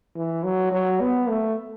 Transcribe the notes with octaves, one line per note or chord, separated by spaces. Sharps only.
E3
F#3
F#3
B3
A3